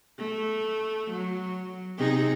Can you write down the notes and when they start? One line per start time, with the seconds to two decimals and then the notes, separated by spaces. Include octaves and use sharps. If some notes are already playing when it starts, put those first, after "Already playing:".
0.18 A3
1.11 F#3
1.98 C3 D#4 G#4